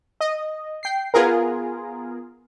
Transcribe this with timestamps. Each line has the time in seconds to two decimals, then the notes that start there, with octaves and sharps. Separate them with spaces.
0.21 D#5
0.83 G5 C7
1.14 B3 F4 G#4 A#4